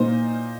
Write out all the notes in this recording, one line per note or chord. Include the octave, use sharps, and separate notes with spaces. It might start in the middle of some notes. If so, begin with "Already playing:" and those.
Already playing: A#2 A#3 D#4 C5